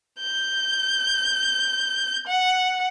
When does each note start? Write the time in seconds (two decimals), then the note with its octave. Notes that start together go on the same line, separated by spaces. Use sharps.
0.20 G6
2.28 F#5